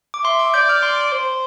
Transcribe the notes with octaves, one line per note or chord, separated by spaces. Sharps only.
D6
E5 C6
D6
D5 G6
F6
C6
C5